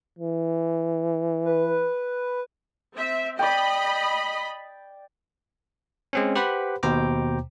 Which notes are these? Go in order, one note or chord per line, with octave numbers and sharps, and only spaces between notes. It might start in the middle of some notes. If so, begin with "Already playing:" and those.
E3
B4
C4 E5
D5 D#5 G5 B5
G#3 C4 C#4
G4 B4 C5 F#5 B5
D#2 B2 C5 G5 A#5 D6